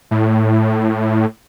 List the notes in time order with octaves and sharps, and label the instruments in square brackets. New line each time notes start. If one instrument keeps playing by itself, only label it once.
[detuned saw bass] A2